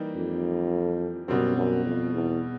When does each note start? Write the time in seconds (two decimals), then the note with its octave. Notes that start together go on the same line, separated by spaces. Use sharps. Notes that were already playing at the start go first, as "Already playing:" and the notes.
Already playing: E3 G3 A#3 D#4 G4
0.15 F2
1.28 F#2 B2 G3 C4
1.56 F#2
1.85 F2
2.13 E2